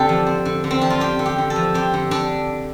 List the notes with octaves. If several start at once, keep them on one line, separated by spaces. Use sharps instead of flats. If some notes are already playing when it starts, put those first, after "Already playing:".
Already playing: D3 C4 D4 G4 A4
F3
C4
D3
D3
C4
F3 D4
F4
C4 G4
D3
G4
D3
A4
F3
C4 G4
D3
D3 D4